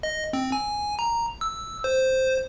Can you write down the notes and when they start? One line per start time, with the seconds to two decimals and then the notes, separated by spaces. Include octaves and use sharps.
0.03 D#5
0.33 C4
0.52 G#5
0.99 A#5
1.41 E6
1.84 C5